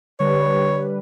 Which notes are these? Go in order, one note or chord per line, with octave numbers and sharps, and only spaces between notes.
D3 G3 B4 C#5